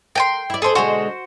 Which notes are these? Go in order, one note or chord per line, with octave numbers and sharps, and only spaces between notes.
A#4 G5 G#5 C6
E4 D5
G#4 A4 C5 D5
B2 D3 G#3 F#4 C5